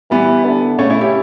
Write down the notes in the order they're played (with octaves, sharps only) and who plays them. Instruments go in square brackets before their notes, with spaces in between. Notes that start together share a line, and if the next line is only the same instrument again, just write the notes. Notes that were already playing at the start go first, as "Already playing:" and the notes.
[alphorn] E3 [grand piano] G3 B3
[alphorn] D3
[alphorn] C#3 [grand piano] A3 C#4
[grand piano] C#4 E4
E4 G4